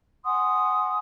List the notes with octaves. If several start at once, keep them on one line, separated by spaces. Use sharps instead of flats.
F#5 G#5 C6 D#6